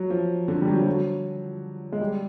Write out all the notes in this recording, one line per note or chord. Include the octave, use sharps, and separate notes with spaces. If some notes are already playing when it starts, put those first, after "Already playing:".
Already playing: F#3
F3
D3
G3
F#3
F3
F#3
G#3
G3